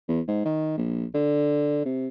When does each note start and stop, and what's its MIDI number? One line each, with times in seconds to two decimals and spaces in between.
0.09 0.21 40
0.28 0.44 44
0.45 0.73 51
0.77 1.05 34
1.14 1.82 50
1.85 2.08 48